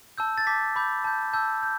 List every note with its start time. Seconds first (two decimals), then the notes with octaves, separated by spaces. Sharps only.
0.18 A5 E6 G6
0.38 A6
0.47 A5 D6 G6 B6
0.76 B5 D6 G6
1.04 A5 G6
1.33 A5 E6 G6
1.62 G6